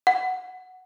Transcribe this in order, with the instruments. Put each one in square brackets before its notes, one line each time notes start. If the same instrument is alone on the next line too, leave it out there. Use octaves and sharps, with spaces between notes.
[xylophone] F#5